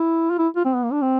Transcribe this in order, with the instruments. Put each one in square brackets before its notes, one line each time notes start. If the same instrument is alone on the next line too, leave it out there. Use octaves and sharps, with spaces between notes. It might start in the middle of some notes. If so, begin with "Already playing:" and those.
Already playing: [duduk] E4
F4
E4
F4
C4
B3
A#3
D4
C4